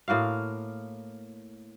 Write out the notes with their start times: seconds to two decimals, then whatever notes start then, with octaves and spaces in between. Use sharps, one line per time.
0.08 A2 A#3 F#4 F5